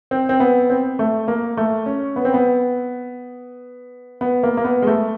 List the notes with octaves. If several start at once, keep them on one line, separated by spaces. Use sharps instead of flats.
C4
C4
B3
C4
A3
A#3
A3
C#4
B3
C4
B3
B3
A#3
A#3
B3
G#3
A3